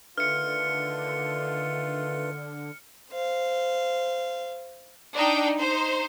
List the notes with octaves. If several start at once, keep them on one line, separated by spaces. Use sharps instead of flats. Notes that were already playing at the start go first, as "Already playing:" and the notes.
D3 D#3 A3 F4 B4 F6 C#7
C5 F5
D4 D#4 G5
D#4 C5